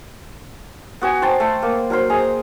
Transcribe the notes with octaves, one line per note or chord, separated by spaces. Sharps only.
B3 F#4 G#5
C5 G5 A5
A3
A#3
F#3 A#4 C5
G#4 D#5 G#5 A#5